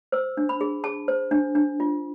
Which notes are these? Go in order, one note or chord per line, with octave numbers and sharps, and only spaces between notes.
C5 E6
D4
B5
G#4
G#4 A5
C5
D4
D4
F4